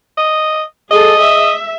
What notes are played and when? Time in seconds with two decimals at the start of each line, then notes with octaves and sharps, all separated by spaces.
0.17 D#5
0.91 G#4 A4 D#5
1.22 E5